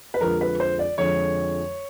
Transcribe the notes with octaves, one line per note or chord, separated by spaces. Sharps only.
B4
F2 D3 F3 G#3 A#4
B4
C5
D5
F2 D3 F3 G#3 C#5